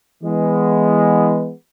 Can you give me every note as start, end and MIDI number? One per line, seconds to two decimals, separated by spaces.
0.23 1.52 52
0.23 1.52 56
0.23 1.52 59